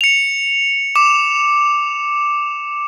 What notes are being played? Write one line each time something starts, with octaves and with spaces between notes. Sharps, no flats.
C#7 F7
D6 E7